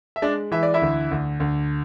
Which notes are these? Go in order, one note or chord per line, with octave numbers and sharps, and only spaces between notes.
E5
G#3 D4 D5
E3 E5
D5
E4 E5
D2
D2
D2